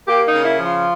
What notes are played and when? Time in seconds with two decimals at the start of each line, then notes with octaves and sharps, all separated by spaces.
0.07 A#3 G4
0.27 D#4
0.32 C#3
0.45 E4
0.58 F3
0.64 F4